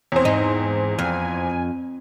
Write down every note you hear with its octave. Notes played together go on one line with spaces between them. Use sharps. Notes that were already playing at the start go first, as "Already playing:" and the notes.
E2 C4 C#5
G#2 D#4
F2 G#5